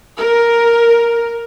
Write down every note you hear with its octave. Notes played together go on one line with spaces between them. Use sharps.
A#4